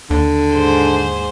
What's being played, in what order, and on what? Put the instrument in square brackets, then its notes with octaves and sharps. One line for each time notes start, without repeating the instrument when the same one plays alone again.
[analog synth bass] D#2 [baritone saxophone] D3
[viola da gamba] G#2 G#4 C5